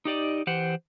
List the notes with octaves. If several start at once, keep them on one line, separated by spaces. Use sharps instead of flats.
D#4 G4 D5 D#5
E3 G4 C5 F#5